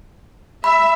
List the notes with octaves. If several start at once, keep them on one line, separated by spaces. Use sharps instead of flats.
E5 B5